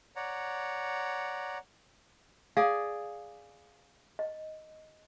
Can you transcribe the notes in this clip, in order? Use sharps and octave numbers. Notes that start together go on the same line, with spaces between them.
C#5 D5 F#5 A#5
G#4 D5 F5
D#5